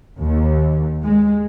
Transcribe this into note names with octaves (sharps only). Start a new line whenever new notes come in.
D#2
G#3